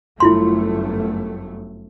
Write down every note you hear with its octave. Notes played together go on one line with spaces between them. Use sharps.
G1 F#2 A3 E4 F4 C6